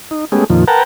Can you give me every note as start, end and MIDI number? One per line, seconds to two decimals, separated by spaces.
0.11 0.25 63
0.32 0.44 56
0.32 0.44 57
0.32 0.44 59
0.32 0.44 61
0.32 0.44 67
0.32 0.44 68
0.50 0.65 41
0.50 0.65 46
0.50 0.65 51
0.50 0.65 53
0.68 0.83 70
0.68 0.83 71
0.68 0.83 78
0.68 0.83 79
0.68 0.83 81
0.68 0.83 82